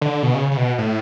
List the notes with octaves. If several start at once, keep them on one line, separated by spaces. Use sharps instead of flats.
D3
B2
C#3
C#3
B2
A2